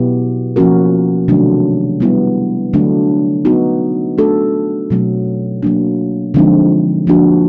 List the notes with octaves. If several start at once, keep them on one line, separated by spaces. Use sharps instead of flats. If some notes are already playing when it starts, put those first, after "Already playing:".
Already playing: B2 F#3 B3 E4 G4
F3 A#3 C#4 F#4 A#4
C3 D#3 F#3 A3 D4
G3 B3 E4
D3 F#3 A3 D4
F#3 B3 D#4 F#4
A3 D4 F#4 A4
B2 F#3 A3 C4
F#3 A#3 D4
D3 F3 G#3 C4 D#4
F3 A#3 D4 F#4